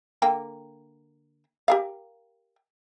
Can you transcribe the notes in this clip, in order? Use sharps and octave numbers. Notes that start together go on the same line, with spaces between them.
D3 A#3 G5
G4 A#4 F5